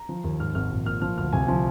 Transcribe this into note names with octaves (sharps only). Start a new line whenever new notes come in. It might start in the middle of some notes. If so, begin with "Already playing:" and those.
Already playing: A#5
F3
D#2
G#2 F6
G#1 F6
A#1
A#2 F6
F3 F6
D2 F6
C2 G#5
F3